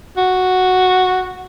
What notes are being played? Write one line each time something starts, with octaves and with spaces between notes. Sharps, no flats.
F#4